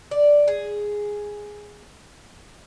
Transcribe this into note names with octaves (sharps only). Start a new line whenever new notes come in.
D5
G#4